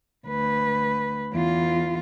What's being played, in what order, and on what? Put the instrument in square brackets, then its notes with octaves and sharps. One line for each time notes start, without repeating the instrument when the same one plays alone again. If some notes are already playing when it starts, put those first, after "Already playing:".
[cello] D2 B4
E2 F4